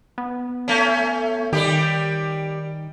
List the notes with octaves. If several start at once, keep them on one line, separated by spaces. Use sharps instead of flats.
B3
A3 C#4
D#3 G3 G4